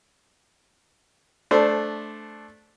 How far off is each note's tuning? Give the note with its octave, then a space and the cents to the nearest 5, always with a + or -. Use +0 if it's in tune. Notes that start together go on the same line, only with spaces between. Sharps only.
A3 -10 D4 +0 C5 +0